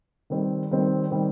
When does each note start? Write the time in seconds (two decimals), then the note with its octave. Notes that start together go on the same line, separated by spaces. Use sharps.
0.30 D#3 G3 C4
0.71 D#3 G3 C4
1.11 D#3 G3 C4